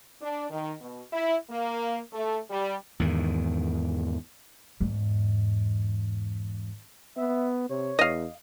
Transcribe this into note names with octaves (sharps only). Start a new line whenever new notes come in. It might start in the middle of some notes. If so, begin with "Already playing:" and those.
D4
D#3
B2
E4
A#3
A3
G3
E2 G#2 D#3
E2 G#2
B3 E5
C3 C#5
E2 D#5 F5